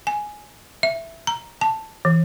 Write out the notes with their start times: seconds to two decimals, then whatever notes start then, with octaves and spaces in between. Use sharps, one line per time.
0.07 G#5
0.83 E5
1.27 A#5
1.61 A5
2.05 E3